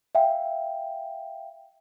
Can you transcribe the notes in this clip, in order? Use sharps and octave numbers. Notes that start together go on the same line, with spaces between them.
E5 F5 G5